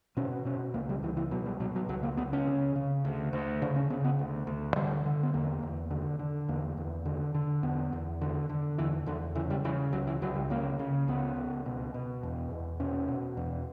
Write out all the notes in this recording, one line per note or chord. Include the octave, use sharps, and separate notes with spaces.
B2 C#4
B2 C#4
C#2 A#3
G3
C#2 E3
E3
B2 F#3
G3
B2 F#3
F#3
C#2 F#3
A#3
C#2 B3
C#4
C#3
C#3
D2
D2
C#3 D4
C#4
C#3 B3
B3
D2
D2
D3 G3
D3
B3
E2 A#3
E2
D3
D3
E2 A#3
E2
D3
D3
E2 B3
E2
D3
D3
E2 E3
E2 D3
C#3 E3
G3
C#3 E3
C#2 F#3
E3
C#2 F#3
G3
C#3 A#3
C#3
C#2 B3
C#2
B2
B2
E2
E2
B2 C#4
B2
E2